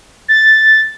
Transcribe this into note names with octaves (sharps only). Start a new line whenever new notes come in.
A6